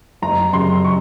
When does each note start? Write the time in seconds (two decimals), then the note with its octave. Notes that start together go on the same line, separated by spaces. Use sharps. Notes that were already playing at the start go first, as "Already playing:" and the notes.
0.22 F#1 A#5
0.53 F#2 C#3 C6
0.85 C#6